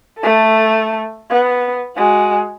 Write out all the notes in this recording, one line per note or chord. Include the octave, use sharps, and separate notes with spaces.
A3 A4
B3
G#3 F#4